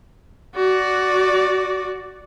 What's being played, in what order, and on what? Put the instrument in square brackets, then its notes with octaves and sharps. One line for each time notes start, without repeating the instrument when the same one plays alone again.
[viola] F#4 D5